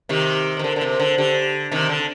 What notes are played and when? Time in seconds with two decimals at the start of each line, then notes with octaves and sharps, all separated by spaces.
0.09 C3 D#3 G4
0.57 D#3 C5
0.64 D3 A#4
0.76 D3
0.81 C3 C5
1.00 D3 C5
1.18 D3 G4
1.72 C3 D#3
1.89 D3